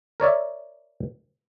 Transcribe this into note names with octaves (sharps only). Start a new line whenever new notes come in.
A#4 C#5 D5 E5